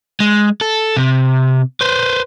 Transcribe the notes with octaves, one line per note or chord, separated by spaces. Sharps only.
G#3
A4
C3
B4 C5